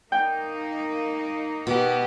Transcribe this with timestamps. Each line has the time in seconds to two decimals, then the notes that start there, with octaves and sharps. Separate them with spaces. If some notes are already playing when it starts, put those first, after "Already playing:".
0.12 A#3 D#4 G5
1.67 B2 B3 G4